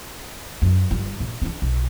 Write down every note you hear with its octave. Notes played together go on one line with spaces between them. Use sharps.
F#2
G1 G3
A#1
C4 D4
B1